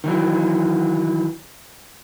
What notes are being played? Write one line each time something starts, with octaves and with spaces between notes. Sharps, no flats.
D#3 E3 F#3